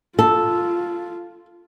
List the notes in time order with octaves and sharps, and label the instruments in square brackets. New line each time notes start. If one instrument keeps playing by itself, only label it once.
[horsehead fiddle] F4 [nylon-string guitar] A4